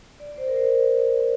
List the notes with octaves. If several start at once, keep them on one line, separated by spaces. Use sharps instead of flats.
D5
C5
A#4
C5